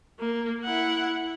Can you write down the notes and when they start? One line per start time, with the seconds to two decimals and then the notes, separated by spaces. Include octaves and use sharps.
0.20 A#3
0.64 E4 F#5